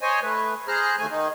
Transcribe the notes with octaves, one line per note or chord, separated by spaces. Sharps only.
C5 C#5 D#5 G#5
A3 B4
G#4 C5 A#5 F6 F#6
D#2 A3 G#5
D#3 D#4